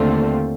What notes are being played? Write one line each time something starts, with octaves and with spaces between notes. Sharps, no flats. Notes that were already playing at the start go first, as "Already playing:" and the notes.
Already playing: D#2 D3 A3 C4 F4